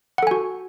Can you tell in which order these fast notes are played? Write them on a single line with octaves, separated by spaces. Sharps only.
F#5 A4 G#5 F#4